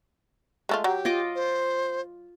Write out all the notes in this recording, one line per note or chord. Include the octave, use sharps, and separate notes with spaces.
G#3 A3 F4
F#3 G4
F4 D#5 D6
C5